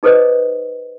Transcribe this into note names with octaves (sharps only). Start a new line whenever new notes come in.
D#4 G#4 A4 B4 C5 D#5